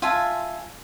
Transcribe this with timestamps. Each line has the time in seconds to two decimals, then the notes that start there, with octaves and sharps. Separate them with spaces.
0.02 F4 E5 G#5 A5